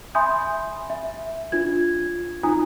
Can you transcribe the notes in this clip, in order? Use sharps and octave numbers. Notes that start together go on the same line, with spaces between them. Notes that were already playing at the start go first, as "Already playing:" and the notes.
E5 G#5 B5 C6 D#6 G6
E5
D4 F4 G#6
D#4 F4 G#5 A#5 D#6